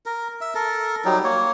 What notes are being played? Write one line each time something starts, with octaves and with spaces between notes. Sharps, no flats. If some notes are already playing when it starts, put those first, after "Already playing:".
A#4
E5
A4 A#4
F#3 G3 D#4
A#3 C#5